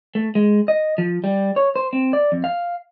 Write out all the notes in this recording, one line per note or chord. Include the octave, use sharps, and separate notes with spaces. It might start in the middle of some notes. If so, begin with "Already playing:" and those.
A3
G#3
D#5
F3
G3
C#5
C5
C4
D5
F2
F5